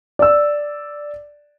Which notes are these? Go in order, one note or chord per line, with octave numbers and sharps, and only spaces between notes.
D5 E6